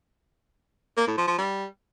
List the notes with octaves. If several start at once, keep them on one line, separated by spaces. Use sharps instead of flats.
A#3
A2
F3
F3
G3